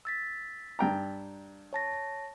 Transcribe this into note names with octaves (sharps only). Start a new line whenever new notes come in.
E6 A6 B6
G2 G5 A#5
C#5 A5 A#6